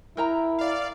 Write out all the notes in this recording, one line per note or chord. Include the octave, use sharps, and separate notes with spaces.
E4 A#4 G5 A#5
D5 F5